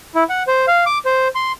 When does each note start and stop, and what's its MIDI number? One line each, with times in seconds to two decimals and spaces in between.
0.15 0.24 64
0.29 0.43 78
0.47 0.66 72
0.68 0.84 77
0.86 0.98 86
1.05 1.28 72
1.35 1.52 84